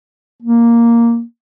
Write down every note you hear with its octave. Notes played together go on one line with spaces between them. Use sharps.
A#3